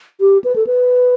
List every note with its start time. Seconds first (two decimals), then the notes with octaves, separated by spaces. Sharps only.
0.20 G4
0.44 B4
0.56 A4
0.67 B4